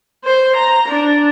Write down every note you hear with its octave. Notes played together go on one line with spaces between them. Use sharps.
C5
A#5
D4